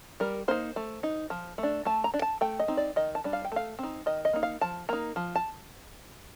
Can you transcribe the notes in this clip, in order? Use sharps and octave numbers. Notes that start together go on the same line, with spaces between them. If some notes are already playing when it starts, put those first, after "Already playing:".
G3 A#4
A#3 D#4 C5
A3
D#4
F3
A3
D4
A3 A5
A#5
D4
A5
A3 G5
D#5
C4 D#4
D5
D#3 D#5
A5
G3 D4
F5
G5
A3 F5
C4 D#4
D#3 D#5
D#5
A#3 D#4
F5
F3 A5
A#3 D#4 A#5
F3
A5